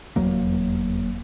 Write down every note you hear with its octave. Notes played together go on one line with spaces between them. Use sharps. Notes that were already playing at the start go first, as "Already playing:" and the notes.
F1 E2 F#3 A#3